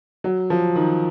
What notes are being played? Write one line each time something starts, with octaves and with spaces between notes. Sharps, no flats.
F#3
F3
D#3